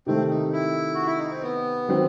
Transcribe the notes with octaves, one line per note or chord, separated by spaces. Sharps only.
C3 D#3 A3 C4
D#4
E4
F#4
E4
D#4
C4
B3
D#3 F#3 C4